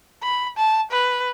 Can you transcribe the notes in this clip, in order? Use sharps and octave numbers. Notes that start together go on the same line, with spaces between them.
B5
A5
B4